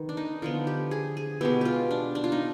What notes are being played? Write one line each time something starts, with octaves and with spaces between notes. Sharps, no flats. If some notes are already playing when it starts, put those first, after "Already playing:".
Already playing: D#3 B3
D4
D#4
D3 F3 B3 F4
G4
G#4
G#4
B2 G#3 B3 G4
F4 G4
D4
D4
F4
D#4